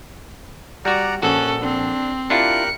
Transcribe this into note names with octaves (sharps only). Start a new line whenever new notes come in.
G3 F#4 D5 F#5 A#5
A#1 C#4 F#4 A4 F#6
C4 D4
D4 E4 F4 G4 A#4 F#6 C#7